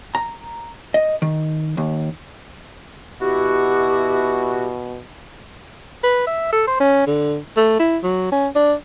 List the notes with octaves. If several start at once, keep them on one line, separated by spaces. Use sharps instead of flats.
A#5
D#5
D#3
D#2
B2 E4 F#4 G4
B4
E5
A4
C5
C#4
D3
A3
E4
F#3
C#4
D4